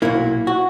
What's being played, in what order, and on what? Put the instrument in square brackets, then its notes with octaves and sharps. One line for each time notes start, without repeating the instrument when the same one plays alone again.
[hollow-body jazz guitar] B1 A#2 A#3 E4
F#4